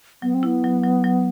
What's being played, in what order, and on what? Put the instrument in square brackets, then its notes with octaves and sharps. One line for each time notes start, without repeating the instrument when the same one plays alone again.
[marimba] F#3 [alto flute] B3
[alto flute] C4
[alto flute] B3 [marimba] E4
[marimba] F#3
F#3
F#3